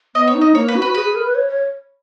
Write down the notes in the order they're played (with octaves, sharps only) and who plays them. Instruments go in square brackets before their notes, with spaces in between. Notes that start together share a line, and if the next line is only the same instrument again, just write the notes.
[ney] B3 [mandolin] D#5
[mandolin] C#5
[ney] D#4
[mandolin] D#5
[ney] A#3 [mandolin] C#5
[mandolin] B4
[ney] F#4
[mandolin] B4
[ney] G#4 [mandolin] B4
[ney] G#4
A#4
B4
C#5
C#5